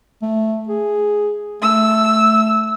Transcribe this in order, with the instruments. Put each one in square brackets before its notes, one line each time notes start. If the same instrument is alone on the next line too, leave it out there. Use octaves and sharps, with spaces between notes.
[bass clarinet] A3
G#4
[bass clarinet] A3 [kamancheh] E6